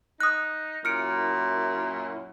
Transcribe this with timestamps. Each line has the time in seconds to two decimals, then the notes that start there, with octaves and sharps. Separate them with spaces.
0.20 D#4 D#6 F#6
0.85 F#2 A#2 E4 F6 C#7 D7